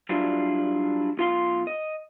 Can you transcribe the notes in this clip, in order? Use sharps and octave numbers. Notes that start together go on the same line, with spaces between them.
F#3 G3 D4 E4 F4
B1 F4 F5 C6
D#5